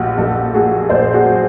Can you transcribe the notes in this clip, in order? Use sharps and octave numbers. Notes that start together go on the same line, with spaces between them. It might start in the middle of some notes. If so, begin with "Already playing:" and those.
Already playing: A#1 F#4 G4
A#1 G4 A4
A#2 F#4 G#4
A#1 C5 D5
F#4 G#4
F#3